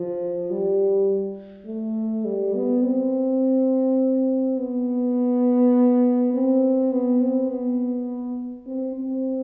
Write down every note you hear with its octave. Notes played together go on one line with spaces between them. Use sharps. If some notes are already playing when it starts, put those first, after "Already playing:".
Already playing: F3
G3
A3
G3
B3
C4
B3
C4
B3
C4
B3
C4
C4